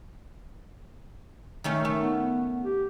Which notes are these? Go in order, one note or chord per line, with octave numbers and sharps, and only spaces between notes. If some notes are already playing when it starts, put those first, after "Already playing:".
D#3 A3 C#4
A3
B3
G4